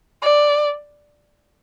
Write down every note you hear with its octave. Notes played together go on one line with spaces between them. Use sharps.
D5